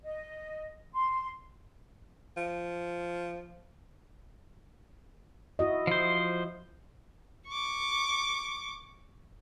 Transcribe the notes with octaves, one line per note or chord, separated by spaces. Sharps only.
D#5
C6
F3
E4 F#4 D#5
F3 C5
C#6 D6